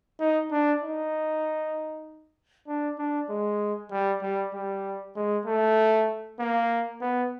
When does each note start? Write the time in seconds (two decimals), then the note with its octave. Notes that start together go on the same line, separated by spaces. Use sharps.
0.20 D#4
0.51 D4
0.83 D#4
2.68 D4
2.99 D4
3.30 G#3
3.91 G3
4.22 G3
4.54 G3
5.16 G#3
5.46 A3
6.40 A#3
7.01 B3